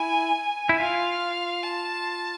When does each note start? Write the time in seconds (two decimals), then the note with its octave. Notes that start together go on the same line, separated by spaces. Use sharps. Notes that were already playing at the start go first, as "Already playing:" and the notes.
Already playing: E4 G#5
0.69 E4
0.80 F4 F5
1.63 A5